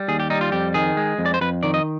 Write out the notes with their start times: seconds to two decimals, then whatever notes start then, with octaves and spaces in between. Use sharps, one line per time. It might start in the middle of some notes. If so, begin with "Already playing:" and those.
Already playing: G3
0.08 D#2 G#4
0.20 G4
0.30 G3 D#4
0.41 F4
0.52 F2 G4
0.74 D#3 G#4
0.97 G#3
1.19 F2
1.26 D5
1.34 C5
1.41 F2 B4
1.63 D#3 D5
1.74 D#5